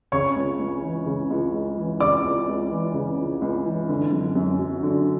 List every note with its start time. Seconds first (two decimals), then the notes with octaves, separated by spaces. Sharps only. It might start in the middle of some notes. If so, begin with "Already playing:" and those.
0.12 C#3 C#5 C#6
0.36 C#2
0.59 C#2
0.82 E3
1.06 C#3
1.30 C#2
1.54 C#2
1.78 E3
2.00 C#3 D5 D6
2.24 C#2
2.48 C#2
2.71 E3
2.94 C#3
3.18 C#2
3.42 C#2
3.66 E3
3.89 D3
4.13 F#2
4.35 F#2
4.59 F#3
4.83 D3